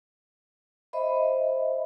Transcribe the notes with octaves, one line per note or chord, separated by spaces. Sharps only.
C5 D#5 E5 B5